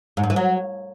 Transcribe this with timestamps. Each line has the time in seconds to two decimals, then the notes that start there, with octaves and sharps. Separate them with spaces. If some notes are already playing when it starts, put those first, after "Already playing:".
0.17 G#2
0.23 G2
0.30 E3
0.36 F#3